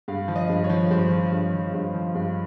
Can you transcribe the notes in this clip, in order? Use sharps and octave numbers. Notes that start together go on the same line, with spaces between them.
G2 F5
F3
D#5
G2
C#5
F3
G2 C5
F3
G2
F3
G2
F3
G2